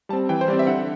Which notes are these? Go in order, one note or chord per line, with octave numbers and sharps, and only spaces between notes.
G3 C4 A5
E3 G5
C5
G3 C4 D5
E5
D3 F#5